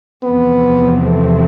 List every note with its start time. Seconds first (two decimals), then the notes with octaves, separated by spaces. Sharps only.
0.23 E2 C3 F3 B3 C4
1.05 A3